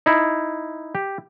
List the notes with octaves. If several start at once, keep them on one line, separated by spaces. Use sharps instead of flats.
D#4 E4
G4